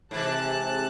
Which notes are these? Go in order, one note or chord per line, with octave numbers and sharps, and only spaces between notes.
G#2 C3 E3 A5 F#6